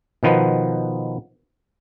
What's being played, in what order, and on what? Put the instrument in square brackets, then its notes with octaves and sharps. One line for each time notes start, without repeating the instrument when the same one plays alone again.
[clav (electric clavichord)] B2 D#3 F3 B3